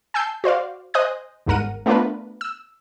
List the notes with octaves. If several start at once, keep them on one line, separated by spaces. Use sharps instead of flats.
G#5 A5 E6 G6 C7
F#4 C5 D5 F5
C5 D#5 G#5 D#6 F#6 G6
G1 D#2 G#2 A#4 F#5 D#7
A3 B3 D4 F4 A#4 B4
E6